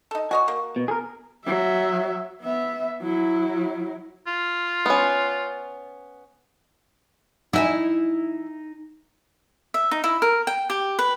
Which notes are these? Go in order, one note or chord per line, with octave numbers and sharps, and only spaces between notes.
D#4 A4
F#4 C#5 D#5 G#5
A#3
B2
G#4 A#4
F#3 E5
B3 E5
F#3 E4
F4
B3 C#4
D#4 E4 E5 G5 G#5
E5
D#4
E4
A#4
G5
G4
B4